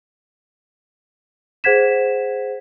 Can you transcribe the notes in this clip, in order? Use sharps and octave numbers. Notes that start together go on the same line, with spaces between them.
G#4 C5 F#5 G#6 B6 E7